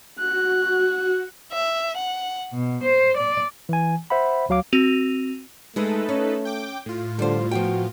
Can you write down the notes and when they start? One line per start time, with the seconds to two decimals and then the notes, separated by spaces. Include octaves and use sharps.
0.19 F#4 F#6
1.52 E5
1.97 F#5
2.53 B2
2.83 C5
3.17 D5
3.69 E3 G#5
4.10 C5 E5 F#5 B5
4.49 D2 F#3 F5 D6
4.73 C4 F#4 D#7 F7
5.76 G#3 A3 D#4 G#4 A4 B4
6.09 C#4
6.45 G5 D6
6.86 A2 F4
7.19 D3 G3 C5
7.51 F3 B3 F#4 G5